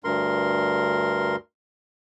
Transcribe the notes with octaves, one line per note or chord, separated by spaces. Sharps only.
D2 G2 A#4 C6